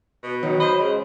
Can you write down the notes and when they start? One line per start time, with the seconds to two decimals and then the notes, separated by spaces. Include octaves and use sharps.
0.23 B2
0.43 D#3 F#3 D#4
0.60 C5 D#5 B5
0.80 C#3 G#3